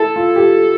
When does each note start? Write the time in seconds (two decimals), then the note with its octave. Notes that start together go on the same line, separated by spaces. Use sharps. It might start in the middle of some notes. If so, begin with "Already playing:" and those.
Already playing: E4 A4
0.16 F4
0.36 G4